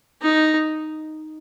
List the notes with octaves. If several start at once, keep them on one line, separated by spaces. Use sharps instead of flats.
D#4